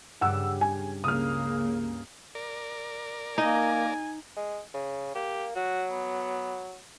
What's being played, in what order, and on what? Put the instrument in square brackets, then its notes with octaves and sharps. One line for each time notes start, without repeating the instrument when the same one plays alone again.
[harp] G2 G3 [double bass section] C#3 [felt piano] F#5 E6
[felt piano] G#5
[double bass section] C#2 C#3 A#3 [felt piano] D#6 F6
[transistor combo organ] A#4 D5
[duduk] A#3 [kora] D#4 [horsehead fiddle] G#5
[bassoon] G#3
C#3
[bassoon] A#3 [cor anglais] G4
[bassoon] F#3 [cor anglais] F#4
[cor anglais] B3